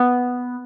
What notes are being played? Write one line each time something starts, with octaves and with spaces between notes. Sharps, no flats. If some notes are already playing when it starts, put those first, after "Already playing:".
Already playing: B3